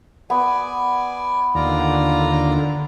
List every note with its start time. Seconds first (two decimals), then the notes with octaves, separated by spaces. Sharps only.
0.30 B3 D5 G#5
1.55 D#2 D3 F4 D5 A#5